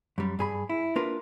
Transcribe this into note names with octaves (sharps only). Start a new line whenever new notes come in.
F#2 G3
G2 G#4 B5
E4
A#3 D4 F4 A#4 B4